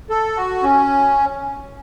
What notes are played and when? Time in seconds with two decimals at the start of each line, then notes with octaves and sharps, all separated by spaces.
0.10 A4
0.37 F#4
0.63 C#4